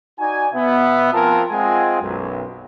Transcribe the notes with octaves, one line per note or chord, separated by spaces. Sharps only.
D#4 F#4 D5 G#5
B2 B3 E5
F3 C4 F4 A#4 G#5 A5
G#3 C4 F4 D#5 F#5 G#5
B1 F#2